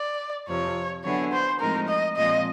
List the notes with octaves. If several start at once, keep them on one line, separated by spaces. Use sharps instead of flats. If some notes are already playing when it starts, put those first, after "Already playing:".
Already playing: D5
F2 C3 F3 C#5
D3 F#3 B3 E4 G#4 C#5
C5
A2 F3 G#3 C4 D#4 A#4
D#5
A#2 F3 G#3 C4 F4 D#5